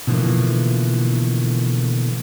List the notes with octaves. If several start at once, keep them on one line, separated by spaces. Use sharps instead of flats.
B2 D3 E3 F3 A3 A#3